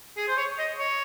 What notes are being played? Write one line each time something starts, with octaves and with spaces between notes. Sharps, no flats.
G#4
C5
C#5
D#5
C#5